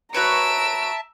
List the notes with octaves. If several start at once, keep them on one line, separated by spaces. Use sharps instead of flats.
F#4 B4 C#5 E5 A5 A#5 E6 D7